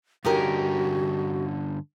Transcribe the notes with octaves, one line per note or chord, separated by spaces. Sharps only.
G2 D3 C#4 D#4 F#4 G4 A#4